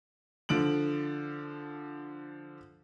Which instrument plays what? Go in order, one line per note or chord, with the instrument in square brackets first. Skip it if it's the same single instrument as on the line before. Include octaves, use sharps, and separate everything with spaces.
[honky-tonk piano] D3 F3 D7 F#7